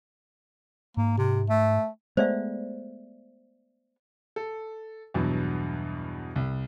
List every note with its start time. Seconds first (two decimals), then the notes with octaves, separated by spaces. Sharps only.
0.97 G#2 A#3
1.18 C3
1.49 A3
2.17 G#3 A3 B3 C5 D5 E5
4.36 A4
5.14 E2 G2 B2 F#3
6.36 C2